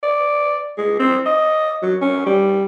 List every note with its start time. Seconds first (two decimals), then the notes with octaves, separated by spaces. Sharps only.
0.03 D5
0.78 G#3
0.99 C4
1.26 D#5
1.83 F#3
2.02 C#4
2.26 G3